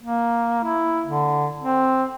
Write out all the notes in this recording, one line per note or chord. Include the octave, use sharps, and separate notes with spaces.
A#3
E4
D3
C4